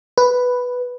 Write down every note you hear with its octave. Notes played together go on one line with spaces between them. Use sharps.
B4